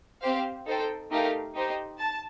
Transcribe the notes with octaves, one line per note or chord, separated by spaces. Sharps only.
C4 G4 C5 F5
D#4 A4 C5 G5
A3 D#4 G4 A#4 F5
D#4 G4 C5
A5